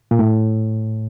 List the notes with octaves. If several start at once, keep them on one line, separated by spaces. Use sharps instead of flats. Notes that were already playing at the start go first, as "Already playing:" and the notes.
A#2
A2